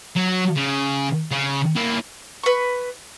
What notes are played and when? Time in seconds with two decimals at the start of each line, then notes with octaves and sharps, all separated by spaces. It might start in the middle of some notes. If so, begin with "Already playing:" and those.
0.16 F#3
0.56 C#3
1.31 C#3
1.76 A#3 E4
2.44 B4 C#6